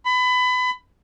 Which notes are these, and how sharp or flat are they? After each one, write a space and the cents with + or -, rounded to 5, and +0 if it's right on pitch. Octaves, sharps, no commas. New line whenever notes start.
B5 +25